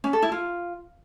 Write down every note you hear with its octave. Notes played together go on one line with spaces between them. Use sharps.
C#4
A4
E4
F4